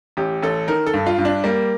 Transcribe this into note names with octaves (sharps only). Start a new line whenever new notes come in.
A1 G4
A1 A4
D#3 A#4
A4
G2
F4
G2
D4
G3 A#3